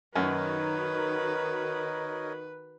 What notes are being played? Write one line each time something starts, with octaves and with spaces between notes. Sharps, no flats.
F#2 D#3 F#4 A#4 B4 C#5 D#5